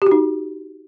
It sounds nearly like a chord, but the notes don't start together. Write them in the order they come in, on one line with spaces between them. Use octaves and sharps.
G4 F#4 D#4